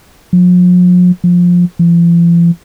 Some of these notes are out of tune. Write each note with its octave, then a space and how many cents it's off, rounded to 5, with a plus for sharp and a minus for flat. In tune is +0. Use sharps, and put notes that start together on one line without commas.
F3 +45
F3 +15
F3 -45